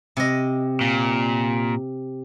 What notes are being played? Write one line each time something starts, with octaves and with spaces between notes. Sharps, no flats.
C3 D#5
A#2